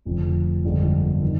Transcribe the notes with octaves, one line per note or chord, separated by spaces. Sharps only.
F1 F2 D3 F3
G1 F2 D3 G#3
D#3